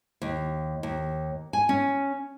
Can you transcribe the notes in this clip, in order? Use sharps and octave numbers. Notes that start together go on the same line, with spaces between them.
D#2
D#2
G#5
C#4